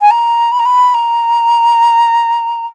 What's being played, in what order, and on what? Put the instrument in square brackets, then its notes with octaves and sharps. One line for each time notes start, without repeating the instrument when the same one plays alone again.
[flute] G#5
A#5
B5
A#5
B5
A#5